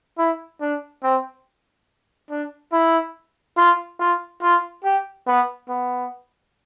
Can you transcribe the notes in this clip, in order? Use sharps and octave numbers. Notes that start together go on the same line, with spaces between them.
E4
D4
C4
D4
E4
F4
F4
F4
G4
B3
B3